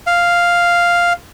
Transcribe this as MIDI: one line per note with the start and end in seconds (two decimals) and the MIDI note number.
0.07 1.13 77